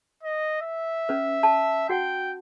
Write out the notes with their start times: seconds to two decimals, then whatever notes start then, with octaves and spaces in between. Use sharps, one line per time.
0.23 D#5
0.61 E5
1.09 C#4 B4
1.43 A5
1.89 F#4 F#5 G5